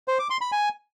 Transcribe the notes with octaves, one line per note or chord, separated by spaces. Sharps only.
C5
D6
C6
B5
G#5